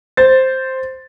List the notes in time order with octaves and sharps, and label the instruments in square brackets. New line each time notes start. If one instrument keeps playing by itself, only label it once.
[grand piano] C5 A6